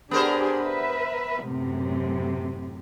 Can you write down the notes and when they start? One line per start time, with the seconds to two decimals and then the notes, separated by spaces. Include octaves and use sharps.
0.11 B3 D4 G4 G#4 A#4 C5
0.60 B4 E5
1.46 F#2 A2 C3